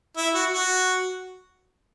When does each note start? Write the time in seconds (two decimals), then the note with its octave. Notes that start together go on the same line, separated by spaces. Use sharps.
0.17 E4
0.34 F#4
0.51 F#4